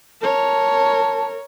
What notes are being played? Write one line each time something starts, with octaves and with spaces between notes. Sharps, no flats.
A#4 C#5 A5